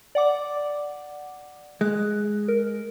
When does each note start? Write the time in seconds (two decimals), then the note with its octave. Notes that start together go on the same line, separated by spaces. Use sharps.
0.15 D5 F#5 D6
1.81 G#3 F#6
2.48 A#4